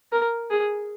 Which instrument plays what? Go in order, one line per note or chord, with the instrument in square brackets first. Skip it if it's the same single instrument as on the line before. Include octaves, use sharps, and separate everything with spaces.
[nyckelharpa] A#4
G#4